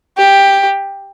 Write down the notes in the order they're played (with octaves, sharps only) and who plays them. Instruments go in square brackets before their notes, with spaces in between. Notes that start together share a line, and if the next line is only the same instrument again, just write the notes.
[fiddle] G4